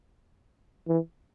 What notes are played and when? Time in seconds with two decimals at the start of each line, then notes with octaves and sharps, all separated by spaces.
0.88 E3